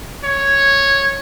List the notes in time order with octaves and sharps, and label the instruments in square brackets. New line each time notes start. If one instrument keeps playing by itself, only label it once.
[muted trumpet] C#5